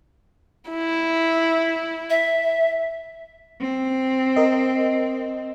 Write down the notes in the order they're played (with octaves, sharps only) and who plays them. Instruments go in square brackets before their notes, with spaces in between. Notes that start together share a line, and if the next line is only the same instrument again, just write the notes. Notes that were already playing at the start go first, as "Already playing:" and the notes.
[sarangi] E4
[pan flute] E5
[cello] C4
[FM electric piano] A#4 D#5